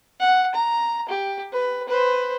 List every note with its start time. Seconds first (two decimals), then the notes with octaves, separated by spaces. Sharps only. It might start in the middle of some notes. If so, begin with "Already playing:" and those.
0.20 F#5
0.55 A#5
1.08 G4
1.53 B4
1.88 B4 C5